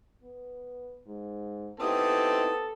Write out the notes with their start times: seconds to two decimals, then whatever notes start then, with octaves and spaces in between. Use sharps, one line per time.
0.23 B3
1.06 G#2
1.80 B3 C4 D#4 E4 G4 A4 D#6